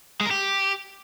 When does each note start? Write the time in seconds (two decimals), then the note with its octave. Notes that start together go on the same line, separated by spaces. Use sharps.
0.21 G#3
0.26 A#4
0.31 G4